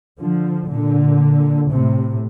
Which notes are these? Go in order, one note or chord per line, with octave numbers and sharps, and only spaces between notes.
D3 F3
A#2 D3
A2 C3